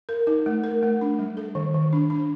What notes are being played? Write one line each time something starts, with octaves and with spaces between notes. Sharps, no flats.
A#4
D#4
A3
A#4
A3
D4
G3
A4
D#3
D#3
D4
D4